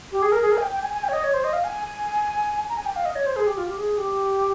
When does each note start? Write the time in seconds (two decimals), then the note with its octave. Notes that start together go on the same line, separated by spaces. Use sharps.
0.12 G4
0.22 G#4
0.32 A#4
0.42 G#4
0.52 A#4
0.58 G#5
0.62 G5
0.73 G5
0.82 G#5
0.93 G#5
1.03 G5
1.09 C#5
1.13 D#5
1.24 C#5
1.34 C5
1.44 D#5
1.53 F5
1.64 G#5
2.69 A#5
2.76 G#5
2.86 G5
2.96 F5
3.05 D#5
3.16 C#5
3.26 C5
3.36 G#4
3.47 G4
3.57 F4
3.67 G4
3.77 G#4
3.98 G4